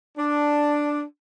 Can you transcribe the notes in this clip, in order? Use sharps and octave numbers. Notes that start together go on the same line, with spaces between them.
D4